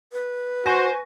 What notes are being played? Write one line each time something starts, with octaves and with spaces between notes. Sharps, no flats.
B4
F#4 C5 G#5 C#6 A#6